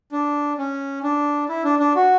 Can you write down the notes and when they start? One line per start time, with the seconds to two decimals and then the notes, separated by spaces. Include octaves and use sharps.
0.12 D4
0.58 C#4
1.03 D4
1.49 E4
1.64 D4
1.79 D4
1.95 F#4